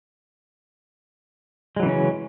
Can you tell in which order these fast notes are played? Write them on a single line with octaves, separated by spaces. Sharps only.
G#3 F#3 E3 C#3 C#4